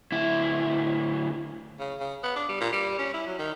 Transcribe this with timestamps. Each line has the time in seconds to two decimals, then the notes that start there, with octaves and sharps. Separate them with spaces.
0.12 D2 E4
1.79 C#3
2.00 C#3
2.23 B3
2.36 D4
2.49 G3
2.61 A#2
2.73 G3
2.99 C#4
3.14 E4
3.27 F#3
3.39 D#3